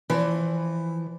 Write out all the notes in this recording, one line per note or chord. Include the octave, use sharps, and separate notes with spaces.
E3 F3